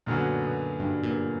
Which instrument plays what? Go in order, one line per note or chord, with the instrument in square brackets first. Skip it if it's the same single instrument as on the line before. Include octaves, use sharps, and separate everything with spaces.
[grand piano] F#2 D3 F#3 B3 F#4 [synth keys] A#2
[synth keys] B2
G2
A#2